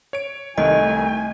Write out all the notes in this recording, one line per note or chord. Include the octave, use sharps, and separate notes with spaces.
C#5 D7
C2 D#3 A3 D#5 G#5